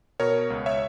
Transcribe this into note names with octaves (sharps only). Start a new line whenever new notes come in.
B2 A#4 C#5
C#2
C#5 E5